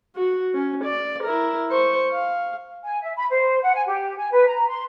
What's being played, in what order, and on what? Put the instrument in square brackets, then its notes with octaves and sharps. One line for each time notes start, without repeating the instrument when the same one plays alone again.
[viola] F#4
C#4
D5
E4 A#4
C5 C#6
F5
[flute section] G#5
E5
B5
C5
F#5
G#5
G4
G#5
B4
A#5
C6